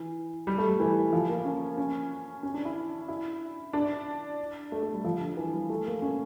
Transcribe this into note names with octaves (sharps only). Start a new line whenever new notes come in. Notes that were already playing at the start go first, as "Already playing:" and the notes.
Already playing: E3
G3
A3
G3
E3
F3
A#3
C#4
C#4
C#4
D4
E4
E4
D4
A3
A3
G3
F3
D3
E3
G3
A3
A#3
C#4